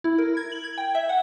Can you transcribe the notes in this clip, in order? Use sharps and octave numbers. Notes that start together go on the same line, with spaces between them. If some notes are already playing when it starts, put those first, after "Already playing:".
E4
A#4
G#6
F#7
G#6
G5
E5
F#5